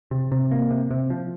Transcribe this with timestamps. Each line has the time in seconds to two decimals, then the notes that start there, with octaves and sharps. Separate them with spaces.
0.11 C3
0.32 C3
0.51 A#3
0.71 C3
0.91 C3
1.10 F3